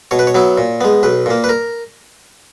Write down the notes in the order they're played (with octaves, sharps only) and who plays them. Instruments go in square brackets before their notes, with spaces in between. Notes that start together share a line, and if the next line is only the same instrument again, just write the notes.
[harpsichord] B2 C#5
B4
C#5
F#3 B3 E4
A#2
G#3 B3
B1 B4
A#2 A#3
B4
A#4